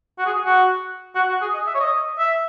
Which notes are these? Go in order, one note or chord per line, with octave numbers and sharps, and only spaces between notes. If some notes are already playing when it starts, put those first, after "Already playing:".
F#4
G#4
F#4
F#4
F#4
G#4
D#5
E5
C#5
D#5
E5